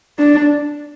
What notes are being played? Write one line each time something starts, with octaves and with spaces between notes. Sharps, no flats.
D4